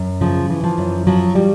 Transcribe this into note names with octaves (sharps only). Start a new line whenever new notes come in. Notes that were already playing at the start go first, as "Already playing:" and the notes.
Already playing: F#2
C#3 F3
E3
F3
F#2
F3 F#3
G3